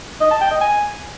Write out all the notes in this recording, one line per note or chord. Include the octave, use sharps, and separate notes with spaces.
D#5
A5
G5
D#5
G#5